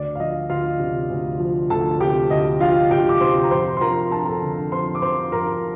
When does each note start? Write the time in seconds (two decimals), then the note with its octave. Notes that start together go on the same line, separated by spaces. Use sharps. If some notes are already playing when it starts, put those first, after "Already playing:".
Already playing: D2 D5
0.15 F5
0.20 F3 D#5
0.49 D2 F4 F5
0.80 C3
1.10 D2
1.40 F3
1.70 D2 A4 A5
2.01 C3 G4 G5
2.30 D2 D#5
2.61 F3 F4 F5
2.91 D2 G4 G5
3.09 D6
3.21 C3 C5 C6
3.43 A#5
3.51 F2 C5 C6
3.77 C6
3.81 F3 A#4 A#5
4.11 F2 A5
4.19 A#5
4.26 A4 A5
4.42 D3
4.72 F2 C5 C6
4.95 D6
5.02 F3 C5 C6
5.32 F2 A#4 A#5